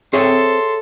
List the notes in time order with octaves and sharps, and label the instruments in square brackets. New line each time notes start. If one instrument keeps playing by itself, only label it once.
[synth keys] C4 [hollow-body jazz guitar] G#4 C#5 E5 [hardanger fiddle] A4 [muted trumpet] C6